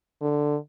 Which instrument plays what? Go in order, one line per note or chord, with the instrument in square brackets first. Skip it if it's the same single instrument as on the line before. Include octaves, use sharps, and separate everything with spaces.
[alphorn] D3